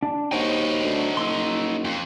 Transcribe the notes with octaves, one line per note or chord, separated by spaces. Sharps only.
D4
D#2 D#4 F#4 C5 C#5 G5
D2
F#1 C6 E6
F2